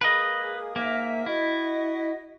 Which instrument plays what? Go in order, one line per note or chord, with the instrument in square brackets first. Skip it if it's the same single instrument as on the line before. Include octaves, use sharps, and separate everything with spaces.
[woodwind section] G#3 A#3 G#4 [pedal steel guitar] B4 D#5
[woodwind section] G#2 E5 [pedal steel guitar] A#3
[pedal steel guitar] E4 [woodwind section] F#4 D#5